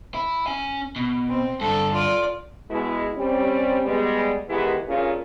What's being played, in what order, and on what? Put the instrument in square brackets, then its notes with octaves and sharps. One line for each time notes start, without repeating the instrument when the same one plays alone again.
[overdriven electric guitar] E4
C#4 G#5
B2
[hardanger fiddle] C4
[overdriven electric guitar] G2 D3 [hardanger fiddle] A4
[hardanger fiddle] F4 D5
[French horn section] B2 G#3 E4
G3 C4 C#4
G3 G#3 B3
D#3 E3 G#3 B3 E4 G4
G2 A#2 C#4 F4 G#4 A#4